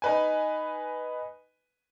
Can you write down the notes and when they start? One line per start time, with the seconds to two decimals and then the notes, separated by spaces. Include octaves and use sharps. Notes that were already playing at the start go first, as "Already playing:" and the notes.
0.02 D#4 B4 G#5